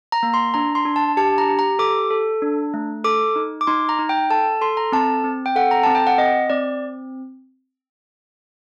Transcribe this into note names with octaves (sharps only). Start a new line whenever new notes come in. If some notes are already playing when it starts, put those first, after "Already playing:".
A#5
A#3
C6
D4 A#5
C6
D4
A5
G4 A5
A#5
G4
A#5
A4 D6
A4
D4
A3
A4 D6
D#4
D6
D#4 C6
A#5
D#4
G5
A4 A5
A4 C6
A#5
C4 A5
C4
G5
A4 F#5
A#5
C4 A5
G5
F#5
C4 D#5
C4 D5